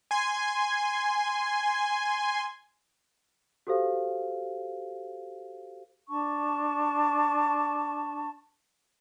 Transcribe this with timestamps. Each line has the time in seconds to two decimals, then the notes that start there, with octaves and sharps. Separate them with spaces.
0.11 G#5 C6
3.67 F#4 G4 A4 C5 F5
6.09 D4 A5 C#6